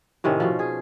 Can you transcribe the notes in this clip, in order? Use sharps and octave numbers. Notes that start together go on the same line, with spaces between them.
A2 C3 D#3 C#4
B2 F3
G#4